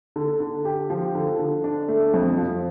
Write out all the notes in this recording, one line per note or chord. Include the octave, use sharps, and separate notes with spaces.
D3
D3
G4
F3
D3
D3
D4
A3
F2
F3